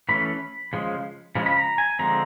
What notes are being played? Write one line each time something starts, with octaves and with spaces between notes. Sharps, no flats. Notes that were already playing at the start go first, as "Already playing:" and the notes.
E3 A3 C#4 B5
C#3 F3 G#3
C#3 F3 G#3
B5
A#5
G#5
D3 F3 G#3 C4 A#5